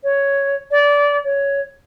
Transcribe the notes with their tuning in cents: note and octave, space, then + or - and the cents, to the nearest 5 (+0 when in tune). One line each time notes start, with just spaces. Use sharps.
C#5 +5
D5 -20
C#5 +10